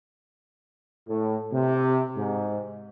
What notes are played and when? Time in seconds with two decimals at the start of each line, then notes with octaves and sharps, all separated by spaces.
1.08 A2
1.53 C3
2.17 G#2